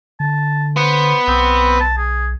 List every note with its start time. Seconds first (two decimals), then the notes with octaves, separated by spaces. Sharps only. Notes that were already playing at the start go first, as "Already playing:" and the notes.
0.20 D3 A5
0.77 B3 C5
1.28 B1 C4
1.80 A5
1.97 G#4